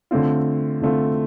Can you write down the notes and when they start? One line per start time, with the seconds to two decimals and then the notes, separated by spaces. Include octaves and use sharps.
0.11 D3 A3 C4 F4
0.82 D3 A3 C4 F4